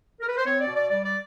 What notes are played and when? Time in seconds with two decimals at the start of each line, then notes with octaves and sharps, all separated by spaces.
0.21 A#4
0.27 B4
0.36 C5
0.44 C4 C#5
0.60 D5
0.67 B2
0.75 D5
0.90 G3 D5
1.05 D5